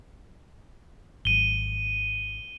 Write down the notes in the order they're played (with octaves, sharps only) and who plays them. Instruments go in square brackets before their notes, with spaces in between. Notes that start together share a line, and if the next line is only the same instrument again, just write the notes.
[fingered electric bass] G#1 F#3 [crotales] D#7 G7